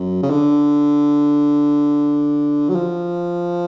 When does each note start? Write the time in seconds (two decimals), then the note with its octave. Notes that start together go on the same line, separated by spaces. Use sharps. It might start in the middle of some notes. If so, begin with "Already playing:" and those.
Already playing: F#2
0.23 C#3
0.30 D3
2.69 F#3
2.75 F3